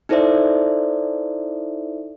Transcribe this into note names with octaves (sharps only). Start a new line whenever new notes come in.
D#4 E4 A4 C5 D5 E5